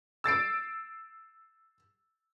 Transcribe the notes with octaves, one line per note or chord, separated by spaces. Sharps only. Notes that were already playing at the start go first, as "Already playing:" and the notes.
E6 A6 C7 D7